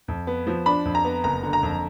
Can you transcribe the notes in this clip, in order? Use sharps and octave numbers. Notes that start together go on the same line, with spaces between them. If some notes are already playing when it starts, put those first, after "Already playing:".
F2
B3
F3
D4 B5
F2
A#5
B3
F#1 A#5
D3
A#5
F2